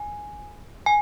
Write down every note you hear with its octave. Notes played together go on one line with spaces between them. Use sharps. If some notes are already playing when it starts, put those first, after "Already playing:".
Already playing: G#5
G#5